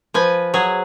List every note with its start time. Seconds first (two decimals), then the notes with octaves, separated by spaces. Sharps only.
0.14 F3 B4 G#5
0.54 F#3 G#4